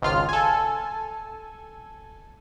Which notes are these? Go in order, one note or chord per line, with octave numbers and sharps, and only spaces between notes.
G#1 C#2 F4 F6
A4 G#5